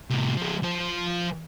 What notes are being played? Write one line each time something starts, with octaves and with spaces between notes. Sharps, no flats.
A2 C3
F3 G#3
F3 C5